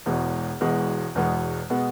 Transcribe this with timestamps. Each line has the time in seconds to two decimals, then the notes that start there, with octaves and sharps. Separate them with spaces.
0.06 E1 E2 B2 G#3 B3
0.61 E1 E2 B2 G#3 B3
1.15 E1 E2 B2 G#3 B3
1.70 B2 G#3 B3